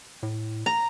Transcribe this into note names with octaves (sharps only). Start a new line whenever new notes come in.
A2
A#5